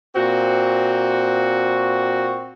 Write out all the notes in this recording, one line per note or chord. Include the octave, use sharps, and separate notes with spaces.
A#2 C4 F#4